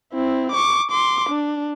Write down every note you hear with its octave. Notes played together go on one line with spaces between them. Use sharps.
C4 E4
C#6 D6
C6 D6
D4